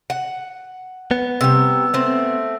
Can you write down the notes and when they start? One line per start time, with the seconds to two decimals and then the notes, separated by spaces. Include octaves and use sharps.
0.10 F#5
1.11 B3
1.41 C3 G3 E6
1.94 A3 C4